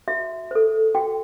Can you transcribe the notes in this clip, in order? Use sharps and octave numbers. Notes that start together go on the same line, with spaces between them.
F#4 E5
A4 C5
F#4 G5